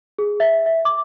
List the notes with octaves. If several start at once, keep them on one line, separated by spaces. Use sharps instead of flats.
G#4
E5
E5
D6